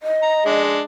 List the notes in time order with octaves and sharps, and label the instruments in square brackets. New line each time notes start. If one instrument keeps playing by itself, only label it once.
[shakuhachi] D#5
[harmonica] A#5
G#3 D4